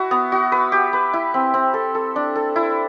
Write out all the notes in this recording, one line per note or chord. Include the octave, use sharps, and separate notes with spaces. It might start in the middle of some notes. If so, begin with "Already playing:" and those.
Already playing: E4 F#4
B3
F#4
B4
G4
B4
E4
C4
C4
A4
A4
D4
A4
E4